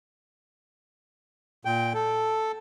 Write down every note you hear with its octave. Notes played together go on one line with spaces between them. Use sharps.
A#2 G5
A4